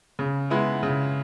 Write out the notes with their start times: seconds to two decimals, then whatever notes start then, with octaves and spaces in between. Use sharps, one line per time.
0.19 C#3
0.50 G#3 B3 E4
0.83 C#3